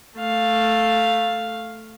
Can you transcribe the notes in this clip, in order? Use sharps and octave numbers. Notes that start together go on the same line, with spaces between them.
A3 F5